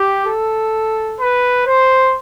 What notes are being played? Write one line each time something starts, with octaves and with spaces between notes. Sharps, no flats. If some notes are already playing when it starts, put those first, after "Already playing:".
Already playing: G4
A4
B4
C5